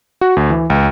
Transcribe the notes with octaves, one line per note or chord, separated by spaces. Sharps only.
F#4
D2
E3
C#2